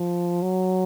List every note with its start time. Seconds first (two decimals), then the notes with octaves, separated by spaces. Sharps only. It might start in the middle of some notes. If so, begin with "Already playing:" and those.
Already playing: F3
0.42 F#3